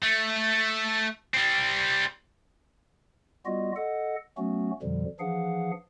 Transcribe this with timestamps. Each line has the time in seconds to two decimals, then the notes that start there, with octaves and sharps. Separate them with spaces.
0.02 A3
1.34 G3 C4
3.46 G3 B3 F4 F#4 D#5
3.76 A4 D#5 F#5
4.37 F#3 A3 B3 C#4 F#4
4.82 F2 B2 D3 F3 G3
5.20 E3 F3 D4 G#4 F5 F#5